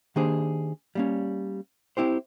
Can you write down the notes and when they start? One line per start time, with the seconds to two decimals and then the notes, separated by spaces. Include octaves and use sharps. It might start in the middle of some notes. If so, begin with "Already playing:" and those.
0.16 D#3 A#3 D4 G4 G#4 C5
0.95 G3 A#3 C#4
1.97 C4 E4 G4 C5